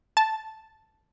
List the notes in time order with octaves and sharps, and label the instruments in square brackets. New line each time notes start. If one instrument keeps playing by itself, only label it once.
[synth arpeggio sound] A5